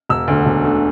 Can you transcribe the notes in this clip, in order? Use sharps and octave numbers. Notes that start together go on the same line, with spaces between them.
E1 E6
D2 D3 A3
E1
D3 A3